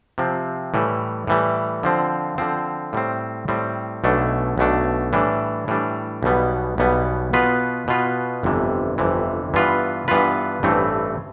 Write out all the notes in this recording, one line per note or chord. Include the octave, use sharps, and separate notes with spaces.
C3 F3 C4
A2 E3 G3
A2 E3 G3
D3 F3 C4
D3 F3 C4
A2 G3 C4
A2 G3 C4
B1 B2 A3 D4
B1 B2 A3 D4
A2 E3 G3 D4
A2 E3 G3 D4
B1 B2 G3 B3
B1 B2 G3 B3
B2 B3 F4 B4
B2 B3 F4 B4
G1 F2 C3 E3
G1 F2 C3 E3
G2 E3 B3 F4 B4
G2 E3 B3 F4 B4
A1 G2 E3 A3 C4